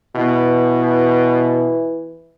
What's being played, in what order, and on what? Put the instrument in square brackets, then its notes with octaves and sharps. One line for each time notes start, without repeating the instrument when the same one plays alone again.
[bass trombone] B2 [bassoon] E3